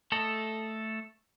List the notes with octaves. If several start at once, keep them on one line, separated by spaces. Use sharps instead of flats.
A3 A4 D#5